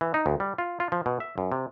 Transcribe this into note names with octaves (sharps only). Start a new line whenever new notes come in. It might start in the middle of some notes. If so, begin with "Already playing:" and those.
E3
D#4
D2
G3
F4
F4
F3
B2
E5
F#2
C3